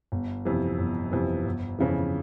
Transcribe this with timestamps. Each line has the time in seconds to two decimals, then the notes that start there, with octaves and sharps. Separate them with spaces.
0.12 G1
0.45 F2 C3 E3
0.79 G1
1.12 F2 C3 E3
1.45 G1
1.79 F2 C#3 E3